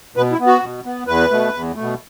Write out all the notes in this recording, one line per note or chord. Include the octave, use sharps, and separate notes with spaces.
B2 B4
E4
B3
F#4
B2
B3
E2 B4
B2 A3
E2
B2 A3